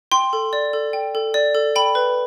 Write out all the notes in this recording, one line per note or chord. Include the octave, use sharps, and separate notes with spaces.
G5 C6
A4
D5
A4
G5
A4
D5
A4
G5 B5
B4